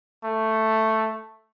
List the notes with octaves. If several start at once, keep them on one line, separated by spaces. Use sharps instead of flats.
A3